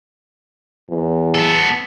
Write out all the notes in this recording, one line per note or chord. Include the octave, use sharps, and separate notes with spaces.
E2
B3 A4